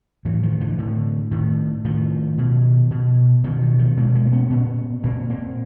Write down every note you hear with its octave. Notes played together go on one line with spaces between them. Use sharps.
A2 E3 F#3
D#3 F3
D3 E3
A2 D3
A2 D#3
A2 D#3 F3
B2
B2
B2 D#3 F3
D#3
D#3 F3
B2 G#3 A#3
G#3 A#3
B3 C#4
A#2 B3 C#4
A#2 A#3 C4
A#3 C4